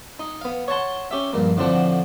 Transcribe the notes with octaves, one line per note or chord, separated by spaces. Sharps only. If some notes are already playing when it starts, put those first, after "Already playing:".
D#4
B3 F5
C#5 F#5 A5 C6
C#4 G4 E5
A#1 G2 A#3
A2 D3 F3 C4 D4 F#5